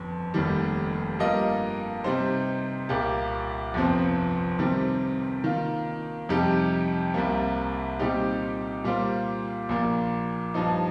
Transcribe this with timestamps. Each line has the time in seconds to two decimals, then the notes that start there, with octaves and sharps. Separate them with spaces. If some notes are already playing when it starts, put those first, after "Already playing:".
Already playing: G1 F2
0.34 F1 D#2 D#3 G3
1.19 G2 G3 A#3 F4 D#5
2.04 C3 G3 D#4 C5
2.89 C2 A#2 A#3 G4
3.74 G1 F2 C3 F3 C4
4.59 C3 D#3 G3 C4
5.44 D#3 A#3 F4
6.29 F2 C3 G3 D#4 G4
7.14 C2 C3 G3 A#3
7.99 A#2 G3 C4 D#4 G4
8.84 A#2 G3 A#3 F4 C5
9.69 A#1 A#2 A#3
10.54 G2 F3 D#4